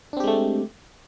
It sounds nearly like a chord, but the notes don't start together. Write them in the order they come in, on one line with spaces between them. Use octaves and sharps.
D4 C4 G4 G#3 A3